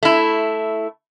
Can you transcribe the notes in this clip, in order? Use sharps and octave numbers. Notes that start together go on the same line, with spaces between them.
A3 E4